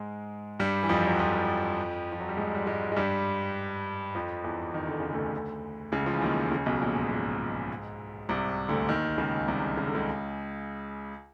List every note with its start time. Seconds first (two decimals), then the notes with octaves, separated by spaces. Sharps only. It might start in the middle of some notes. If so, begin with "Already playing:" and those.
Already playing: G#2 G#3
0.60 G2 G3
0.83 E3
0.89 F2 F3
1.07 F#3
1.19 F2 F3
2.12 F3
2.20 F#3
2.29 G3
2.37 G#2 G#3
2.55 G3
2.67 G#2 G#3
2.92 G#3
2.96 G2 G3
4.15 F2 F3
4.44 E2 E3
4.74 D#3
4.87 D3
5.00 C#3
5.12 D2 D3
5.92 C#2 C#3
6.06 F3
6.14 E3
6.21 D#2 D#3
6.51 C#2 C#3
6.66 B1 B2
6.81 A#1 A#2
6.96 G#2
7.11 G#2
8.29 C2 C3
8.69 D2 D3
8.88 D#2 D#3
9.18 C#2 C#3
9.47 C2 C3
9.77 C#3
9.87 D3
9.95 C#2 C#3